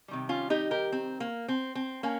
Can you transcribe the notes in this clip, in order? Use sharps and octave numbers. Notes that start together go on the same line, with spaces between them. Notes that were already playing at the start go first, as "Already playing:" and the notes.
C3 D#3 G3
C#4 F4
D#4 G4
G4 A#4
C4
A#3
C4
C4
A#3 C#4